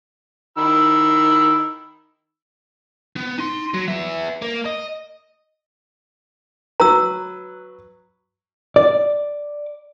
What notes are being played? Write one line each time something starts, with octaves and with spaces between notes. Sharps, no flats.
D#3 B5 E6
B3
D#4 C6
F#3
B3 E5
A#3
D#5
F#3 B4 A#5 E6
D5